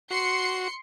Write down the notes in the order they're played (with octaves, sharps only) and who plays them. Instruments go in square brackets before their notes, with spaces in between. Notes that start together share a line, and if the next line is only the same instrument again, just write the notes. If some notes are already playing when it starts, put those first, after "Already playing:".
[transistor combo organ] F#4 [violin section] C6 C7 C#7